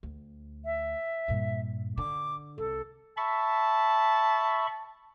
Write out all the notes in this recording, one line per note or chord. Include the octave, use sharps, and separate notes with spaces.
D2
E5
G2 A#2
D3 D6
C2 A4
E5 A5 B5 C#6